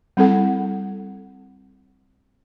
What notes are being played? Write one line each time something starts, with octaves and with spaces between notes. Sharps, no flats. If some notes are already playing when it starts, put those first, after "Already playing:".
G3 C4 E4 A4 F#5